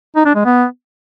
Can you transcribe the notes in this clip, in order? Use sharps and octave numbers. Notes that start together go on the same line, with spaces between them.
D#4
D4
G#3
B3